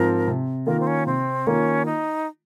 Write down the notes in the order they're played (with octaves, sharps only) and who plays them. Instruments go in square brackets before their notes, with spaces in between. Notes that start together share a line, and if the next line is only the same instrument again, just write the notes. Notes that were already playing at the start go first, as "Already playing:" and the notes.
Already playing: [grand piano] G#2 F3 C4 [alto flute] A#4
[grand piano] C3
[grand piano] D#3 A#3 F4 [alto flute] A#4
[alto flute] C4
C#4
[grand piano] C3 [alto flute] C4
[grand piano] D#3 A#3 F4 [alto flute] C#4
[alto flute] D#4